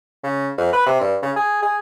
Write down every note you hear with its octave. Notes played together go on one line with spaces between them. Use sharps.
C#3
F2
B4
C3
G2
C#3
G#4
G#4